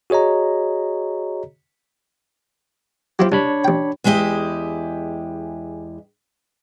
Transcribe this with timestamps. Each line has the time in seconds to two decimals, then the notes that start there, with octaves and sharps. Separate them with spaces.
0.10 F#4 G#4 C#5 D#5 A#5
3.19 F#3 C4 E4 F4 G4
3.32 C2 D4 C#5 B5
3.64 A1 G5
4.04 E2 G#3 E4 G4 D#5